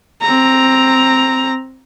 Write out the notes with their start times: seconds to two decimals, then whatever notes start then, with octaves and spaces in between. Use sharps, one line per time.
0.22 C4 A#5